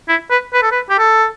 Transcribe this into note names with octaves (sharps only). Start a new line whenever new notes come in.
E4
B4
B4
A4
B4
G4
A4